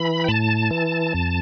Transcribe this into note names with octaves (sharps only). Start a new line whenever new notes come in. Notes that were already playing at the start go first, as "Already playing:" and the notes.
Already playing: E3 B5
G5
A2 A5
E3
F2